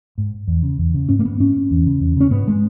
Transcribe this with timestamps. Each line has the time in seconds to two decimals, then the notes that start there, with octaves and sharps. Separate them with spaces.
0.18 G#2
0.47 E2
0.63 C#3
0.78 E2
0.94 C#3
1.09 G#2 C#4
1.19 A#3
1.25 B3
1.39 G#2 C#4
1.71 E2
1.86 C#3
2.00 E2
2.16 C#3 C#4
2.31 G#2 B3
2.48 G#3